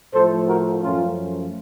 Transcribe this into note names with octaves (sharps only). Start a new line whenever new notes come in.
A2 F3 A3 A4 C5
F#4 A#4
F#2 F3 A3 C#4 F4